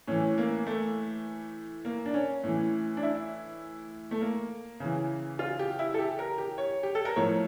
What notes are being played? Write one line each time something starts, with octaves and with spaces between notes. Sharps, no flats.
A2 E3 C#4
A#3
A3
A#3
D4
C#4
A2 E3
D4
E4
A3
A#3
C#3 E3
F4
G4
E4
A4
G4
A#4
G4
C#5
G4
A4
A#4
A2 F3 C#5